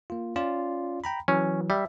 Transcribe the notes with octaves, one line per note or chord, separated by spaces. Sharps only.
A#3 F4
C#4 F4 D5
G5 A#5 B5
E3 F#3 C#4
G3 E5